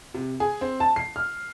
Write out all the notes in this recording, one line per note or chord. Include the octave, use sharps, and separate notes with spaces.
C3
G#4
C4
A5
C7
F6